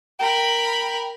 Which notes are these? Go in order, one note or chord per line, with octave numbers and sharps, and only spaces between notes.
A#4 G5 B5